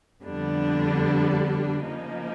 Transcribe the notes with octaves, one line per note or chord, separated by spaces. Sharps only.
F2 D3 G3 B3 D4
C#3 F3 A#3 D#4